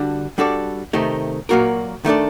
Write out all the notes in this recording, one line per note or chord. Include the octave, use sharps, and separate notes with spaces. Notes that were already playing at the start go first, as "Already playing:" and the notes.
Already playing: D3 G3 D4 F#4
G3 D4 F#4 A4 D5
C3 D#3 A3 D#4 G4
A#2 F#3 A#3 F#4 A#4
D#3 A3 D4 A4 D5